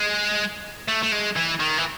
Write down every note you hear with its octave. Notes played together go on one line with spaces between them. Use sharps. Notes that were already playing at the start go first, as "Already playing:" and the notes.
Already playing: G#3
A3
A3
G#3
E3
D#3
E3